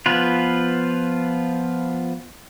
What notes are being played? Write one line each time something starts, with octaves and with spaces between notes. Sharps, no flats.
F3 B3 F4 B4